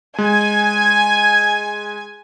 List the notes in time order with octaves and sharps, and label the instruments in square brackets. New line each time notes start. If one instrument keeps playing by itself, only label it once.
[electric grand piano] G#3 [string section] G#5